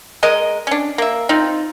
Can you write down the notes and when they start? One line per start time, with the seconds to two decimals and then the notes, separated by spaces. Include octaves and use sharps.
0.23 G#3 A#4 D#5
0.67 C#4 D4
0.98 A#3 E5
1.29 C4 D#4 F4